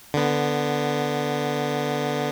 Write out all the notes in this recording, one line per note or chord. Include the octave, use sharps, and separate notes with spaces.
D3 B3